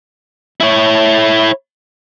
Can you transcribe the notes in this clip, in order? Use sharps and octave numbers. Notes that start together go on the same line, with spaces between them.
E4 C#5